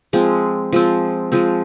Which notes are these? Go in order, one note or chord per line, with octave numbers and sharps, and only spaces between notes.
F3 G#3 C4
F3 G#3 C4
F3 G#3 C4